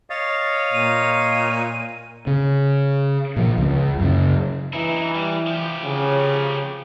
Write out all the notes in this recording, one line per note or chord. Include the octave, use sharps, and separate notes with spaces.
C#5 D#5 F5 A6
A#2 D#7
C#3
A#2 F3
C#2 G#3
F#2 C#3
E3 D#4 E4
G3
F3 G4
C#3